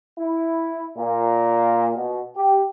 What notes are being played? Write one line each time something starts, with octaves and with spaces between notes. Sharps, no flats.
E4
A#2
B2
G4